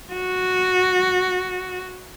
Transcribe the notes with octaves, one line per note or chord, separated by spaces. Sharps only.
F#4